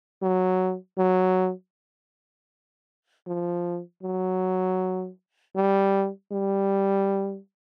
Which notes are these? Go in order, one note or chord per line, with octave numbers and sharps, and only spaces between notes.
F#3
F#3
F3
F#3
G3
G3